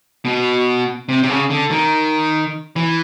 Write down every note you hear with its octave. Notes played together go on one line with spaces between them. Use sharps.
B2
C3
C3
C#3
D3
D#3
E3